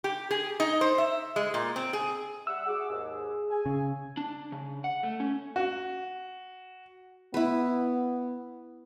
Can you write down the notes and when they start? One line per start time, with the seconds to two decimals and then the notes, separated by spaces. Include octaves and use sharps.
0.04 G4
0.31 G#4
0.60 D#4
0.81 C5
0.98 E5
1.36 G#3
1.54 A#2
1.76 C4
1.93 G#4
2.47 G3 E5 F#5 E6
2.66 F#4 G#4 F#5 D6
2.90 D#2 G#2
3.51 G#5
3.66 C#3
4.17 D4
4.52 C#3
4.84 F#5
5.03 A3
5.20 C#4
5.56 F#4
7.34 B3 E4 B4